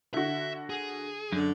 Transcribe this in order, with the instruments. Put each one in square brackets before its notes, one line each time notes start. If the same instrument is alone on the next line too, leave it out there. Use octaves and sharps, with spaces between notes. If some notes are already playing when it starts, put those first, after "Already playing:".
[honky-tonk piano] D3 F#4 [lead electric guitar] E5
[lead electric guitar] G#4
[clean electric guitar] F#2 [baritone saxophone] D3